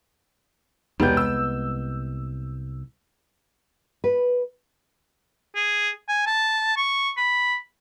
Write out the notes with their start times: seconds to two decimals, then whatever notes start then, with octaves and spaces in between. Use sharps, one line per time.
1.00 E1 C2 G3 G#3 B3 G6
1.17 E6
4.04 B4
5.55 G#4
6.08 G#5
6.26 A5
6.77 C#6
7.17 B5